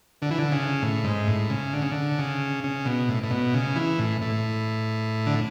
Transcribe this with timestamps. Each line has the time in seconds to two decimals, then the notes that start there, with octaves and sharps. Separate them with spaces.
0.22 D3
0.31 E3
0.38 D3
0.52 C#3
0.82 A2
1.04 G#2
1.28 A2
1.50 C#3
1.73 D3
1.82 C#3
1.92 D3
2.19 C#3
2.64 C#3
2.85 B2
3.09 A2
3.23 A2
3.31 B2
3.54 C#3
3.76 E3
3.99 A2
4.22 A2
5.27 D3